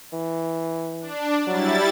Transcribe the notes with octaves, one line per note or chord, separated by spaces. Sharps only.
E3
D4
F#3 G3 E4 A6